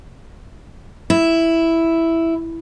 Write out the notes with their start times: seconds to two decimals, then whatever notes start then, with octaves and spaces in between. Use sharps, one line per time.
1.10 E4